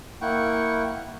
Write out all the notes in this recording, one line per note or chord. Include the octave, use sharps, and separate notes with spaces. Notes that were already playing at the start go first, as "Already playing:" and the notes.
A#3 E4 F#5 G5 C#6